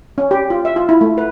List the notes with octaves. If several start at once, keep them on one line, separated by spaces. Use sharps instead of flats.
C#4
G4
F4
E5
F4
E4
A3
B4